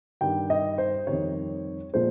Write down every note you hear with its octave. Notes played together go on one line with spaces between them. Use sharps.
G2 D#3 G3 G5
D#5
C5
F2 D#3 G3 C#5
A#2 F3 G#3 C5